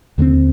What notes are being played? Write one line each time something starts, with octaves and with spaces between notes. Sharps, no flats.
D#2 D3 G3 C4